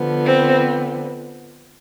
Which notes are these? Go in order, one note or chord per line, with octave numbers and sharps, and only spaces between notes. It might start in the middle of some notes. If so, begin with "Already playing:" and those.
Already playing: D3 F3 B3
C4